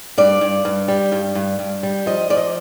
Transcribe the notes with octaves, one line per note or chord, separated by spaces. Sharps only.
G2 D5
G2
G2
G3
G2
G2
G2
G3
F3 D#5
F3 D5
D#5